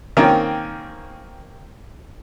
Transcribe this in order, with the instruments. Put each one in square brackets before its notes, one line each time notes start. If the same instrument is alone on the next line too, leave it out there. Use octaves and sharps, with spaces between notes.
[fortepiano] D#3 A#3 C4 C#4